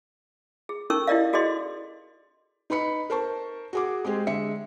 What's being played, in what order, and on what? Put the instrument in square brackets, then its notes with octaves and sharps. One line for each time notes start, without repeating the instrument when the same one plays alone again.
[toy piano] G#4
C#4 D#4 A4 A#4 C#6 E6
E4 G4 A#4 D5 D#5 F5
F#4 G#4 A4 D5 D#5 C6
[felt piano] D#4 B4 B5 C#7
A#4 C5 A5 C#6
F#4 G#4 D6
G#3 C4 G4 G#4
D3 G#3 E5 C#7